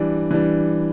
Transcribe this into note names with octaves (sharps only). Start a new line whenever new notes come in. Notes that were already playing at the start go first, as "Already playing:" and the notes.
Already playing: E3 G3 D4
E3 G3 D4